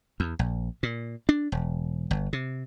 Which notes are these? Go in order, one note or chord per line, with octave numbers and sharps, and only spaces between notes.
E2
A#1
A#2
D4
E1
G1
C3